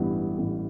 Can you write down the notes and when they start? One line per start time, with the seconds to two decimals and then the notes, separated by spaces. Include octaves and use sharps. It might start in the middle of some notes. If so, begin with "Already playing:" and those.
Already playing: A1 G2 E3 B3
0.38 A1